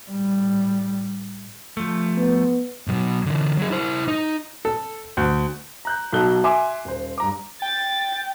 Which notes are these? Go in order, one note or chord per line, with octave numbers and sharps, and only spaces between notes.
A2 G3
F3 A3
B3
B2 F#3
D3 E3
F#3 G#4
E4 C5
D#4
A4
D2
A#5 F#6 G6
B1 B2 D#4 A4 F#6 G7
E5 G#5 C6 D6
D#1 C5
G2 A#5 D6
G5 A6